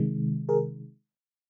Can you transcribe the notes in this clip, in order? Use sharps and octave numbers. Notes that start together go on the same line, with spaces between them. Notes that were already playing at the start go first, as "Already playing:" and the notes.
Already playing: C3 D#3 G#3
G#4 A#4